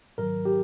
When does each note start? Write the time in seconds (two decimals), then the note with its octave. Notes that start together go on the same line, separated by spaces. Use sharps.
0.18 G#2 D#3 F#3 A#4
0.45 G4